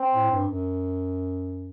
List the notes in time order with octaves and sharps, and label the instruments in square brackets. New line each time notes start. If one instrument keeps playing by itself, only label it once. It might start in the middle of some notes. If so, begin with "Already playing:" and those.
Already playing: [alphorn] C4
[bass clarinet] A2
G2
F#2